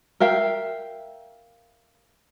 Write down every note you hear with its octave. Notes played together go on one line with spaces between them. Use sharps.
A#4 E5 F5 G5